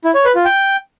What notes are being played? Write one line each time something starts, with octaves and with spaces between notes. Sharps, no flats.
E4
C#5
B4
F4
G5